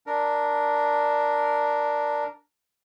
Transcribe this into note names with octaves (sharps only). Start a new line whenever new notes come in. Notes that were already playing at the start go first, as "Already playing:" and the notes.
D4 A#4